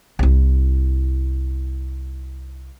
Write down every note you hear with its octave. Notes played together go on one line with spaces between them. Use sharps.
C2 E4